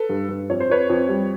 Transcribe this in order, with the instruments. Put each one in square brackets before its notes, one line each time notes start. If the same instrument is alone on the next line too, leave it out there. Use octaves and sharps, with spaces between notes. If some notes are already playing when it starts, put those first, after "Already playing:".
Already playing: [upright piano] A4 B4
G2
G2
F2 C#5
C5
F2 B4 C#5
F2
G3